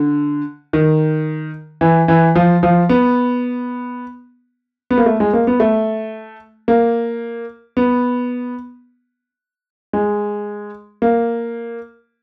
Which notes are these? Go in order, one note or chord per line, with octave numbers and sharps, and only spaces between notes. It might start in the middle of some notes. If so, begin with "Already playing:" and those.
Already playing: D3
D#3
E3
E3
F3
F3
B3
B3
A#3
A3
G#3
A#3
B3
A3
A#3
B3
G#3
A#3